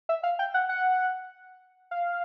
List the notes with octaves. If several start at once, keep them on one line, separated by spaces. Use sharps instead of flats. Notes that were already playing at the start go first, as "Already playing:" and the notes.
E5
F5
G5
F#5
F#5
F5